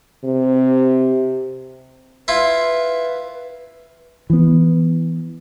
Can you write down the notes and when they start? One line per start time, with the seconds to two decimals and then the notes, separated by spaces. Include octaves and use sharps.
0.24 C3
2.28 E4 F4 B4
4.30 E3 B3